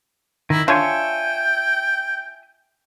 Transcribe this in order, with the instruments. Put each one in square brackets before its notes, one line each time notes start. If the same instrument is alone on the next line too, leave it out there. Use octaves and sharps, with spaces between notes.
[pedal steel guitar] D#3 [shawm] E4
[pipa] D4 F4 C#5 [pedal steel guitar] E5 G#5 C#6 [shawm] G5